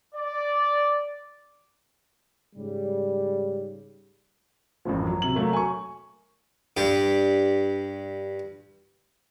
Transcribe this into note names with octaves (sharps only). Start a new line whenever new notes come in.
D5
G#2 C#3 G3
A1 F#2 A2 F3
F#3
C3 F#7
F#3 A3 A#3
G#5 C#6
G2 G4